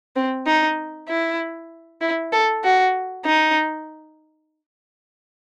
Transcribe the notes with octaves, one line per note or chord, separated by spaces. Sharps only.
C4
D#4
E4
E4
A4
F#4
D#4